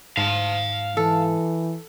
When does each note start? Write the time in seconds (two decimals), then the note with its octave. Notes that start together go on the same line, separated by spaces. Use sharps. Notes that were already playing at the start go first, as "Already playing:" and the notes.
0.17 G#2 F5 A5
0.97 E3 A4